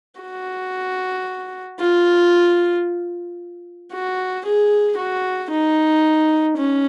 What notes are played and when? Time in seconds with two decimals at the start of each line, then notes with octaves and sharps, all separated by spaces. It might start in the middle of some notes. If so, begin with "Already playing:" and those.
0.21 F#4
1.80 F4
3.93 F#4
4.46 G#4
4.98 F#4
5.51 D#4
6.57 C#4